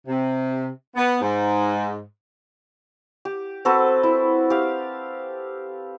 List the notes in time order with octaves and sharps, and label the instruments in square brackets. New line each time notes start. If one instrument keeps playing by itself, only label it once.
[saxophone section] C3
B3
G#2
[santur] G4
C4 F#4 A4 B4
E4
G4 F5